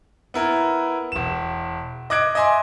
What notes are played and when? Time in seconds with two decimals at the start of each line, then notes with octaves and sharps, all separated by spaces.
0.34 B3 E4 A#4
1.12 E1 E7
2.10 D#5 D6 F#6 G#6 D7
2.35 D#5 E5 G#5 C6